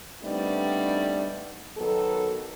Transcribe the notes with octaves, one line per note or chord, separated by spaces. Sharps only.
G3 A3 B3 C4 D4 D#4
D#3 F#3 B3 D#4 A4